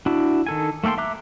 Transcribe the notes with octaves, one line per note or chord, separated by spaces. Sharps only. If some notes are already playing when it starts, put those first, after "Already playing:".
D4 E4 F#4
D#3 A4 G#5
A3 A#3 A4 G5 C6
E5 A#5 D6 F#6